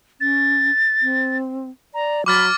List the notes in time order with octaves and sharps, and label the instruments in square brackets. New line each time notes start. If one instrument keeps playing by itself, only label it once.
[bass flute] C#4 [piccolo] A6
[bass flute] C4
[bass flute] D5 [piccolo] A#5
[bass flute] F#3 [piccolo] B5 [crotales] D6 F6 A6